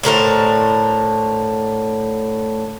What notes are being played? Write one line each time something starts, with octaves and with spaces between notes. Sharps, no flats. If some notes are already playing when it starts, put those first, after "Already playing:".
A2 D3 A#4 C5